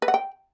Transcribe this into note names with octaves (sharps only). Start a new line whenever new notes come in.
B4
F#5
G5